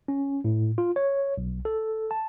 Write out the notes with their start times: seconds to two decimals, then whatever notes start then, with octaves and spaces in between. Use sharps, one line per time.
0.08 C#4
0.44 A2
0.78 F4
0.96 C#5
1.38 B1
1.65 A4
2.11 A5